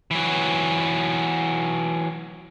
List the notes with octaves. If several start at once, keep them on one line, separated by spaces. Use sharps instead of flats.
E3 F#3